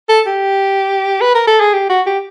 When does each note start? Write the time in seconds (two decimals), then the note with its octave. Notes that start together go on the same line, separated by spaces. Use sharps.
0.09 A4
0.26 G4
1.21 B4
1.35 A#4
1.47 A4
1.60 G#4
1.74 G4
1.90 F#4
2.07 G4